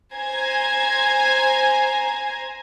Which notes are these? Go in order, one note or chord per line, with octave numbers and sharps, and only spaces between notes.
C5 G#5 A#5 G#6